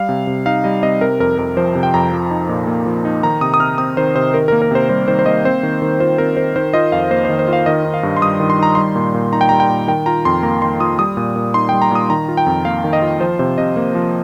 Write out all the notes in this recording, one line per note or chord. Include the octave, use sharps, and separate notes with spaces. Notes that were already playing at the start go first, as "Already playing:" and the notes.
Already playing: G3 F5
C3
C3
D#4 F5
G3 D#5
C3 D#5
C3 A#4
F2 A#4
F2 A#4
F3 C5
C3
G5
F2 A#5
F3
D#4
A#2
A#3
F3
D#4
D#3 A#5
C3 D#6
D#6
C3 F6
C4 D#6
D#3 C5
C3 C5
D#3 A#4
A#3 A#4
A#4
C3 C5
G3 C5
D#3 C5
C5
A#3 D#5
C4 C5
D#3
D#3
F4 C5
C4 A#4
D#3 C5
D#3 C5
F4 D#5
F2 F5
A#3 C5
D#3 C5
C5
F4 F5
D#3 D#5
D#4
F5
G2
C6
G3 D#6
D#3
C6
D#4 A#5
G3 C6
A#2
A#2
D#4 A#5
G5
G3 A#5
G5
A#2
D#3 G5
F4 A#5
F2 C6
A#3 A#5
D#3 C6
F4 D#6
G3 D#6
A#2
A#2
D#4 C6
G3 G5
A#5
A#2 D#6
D#3 A#5
F4
G5
F2
A#3 F5
D#3
D#5
F4
F3 C5
C3 C5
C3 D#5
A#3
F3